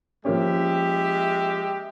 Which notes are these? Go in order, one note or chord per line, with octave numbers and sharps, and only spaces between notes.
F3 G#3 A#3 C#4 G4 E5